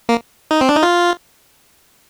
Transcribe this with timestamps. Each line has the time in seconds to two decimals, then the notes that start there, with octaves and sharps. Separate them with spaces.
0.09 A#3
0.51 D#4
0.61 C4
0.69 D4
0.76 D#4
0.83 F4